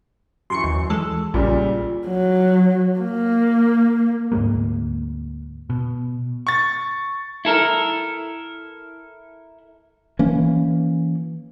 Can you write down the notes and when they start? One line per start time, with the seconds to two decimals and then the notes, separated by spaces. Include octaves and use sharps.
0.50 F#2 E3 C6 C#6 C#7
0.64 D#2
0.90 E3 G#3 A4 E6
1.34 A#1 A#2 C#3 G3
2.07 F#3
2.99 A#3
4.32 D2 G#2 G#3 A#3
5.70 B2
6.47 C#6 A6
7.45 E4 A4 A#4
10.19 E3 A#3 C#4